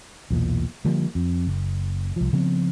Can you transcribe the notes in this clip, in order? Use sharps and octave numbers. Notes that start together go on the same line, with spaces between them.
B1 E2 A#2
D3 F3 G3 A#3
F2
F#1
C2 F3
C#3 F3 B3 C4